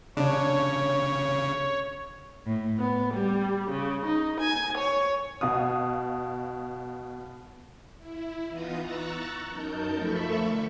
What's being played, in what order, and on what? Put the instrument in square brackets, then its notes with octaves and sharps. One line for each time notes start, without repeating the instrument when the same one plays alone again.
[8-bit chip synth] C#3 [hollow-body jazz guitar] D4 [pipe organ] C#5
[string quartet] A2
B3
G3
C#3
D#4
G#5
C#5
[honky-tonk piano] B2 F5 D#6
[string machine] E4
E3 B3 D#4 F4 A#5 D#6
A#5 C#6 E6 F#6 A6
F#2 D#4 A#4 A5 G6
F3 A3 A4 E5 B5 C#6
D3